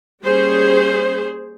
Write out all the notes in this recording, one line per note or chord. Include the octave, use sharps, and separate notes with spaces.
G3 A#3 C#4 G#4 C5